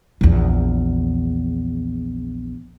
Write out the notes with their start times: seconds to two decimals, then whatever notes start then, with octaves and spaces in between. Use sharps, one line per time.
0.21 A#1 E2